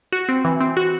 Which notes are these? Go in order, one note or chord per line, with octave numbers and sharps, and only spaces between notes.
F#4
C4
E3
C4
F#4